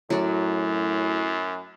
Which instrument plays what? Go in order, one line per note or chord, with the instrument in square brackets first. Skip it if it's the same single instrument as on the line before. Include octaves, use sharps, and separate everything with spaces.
[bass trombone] F#2 [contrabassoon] A2 [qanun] F#3 D5